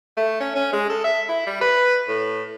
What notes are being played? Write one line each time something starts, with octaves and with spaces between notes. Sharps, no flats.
A3
C#4
C#4
G#3
A4
E5
E4
G3
B4
A2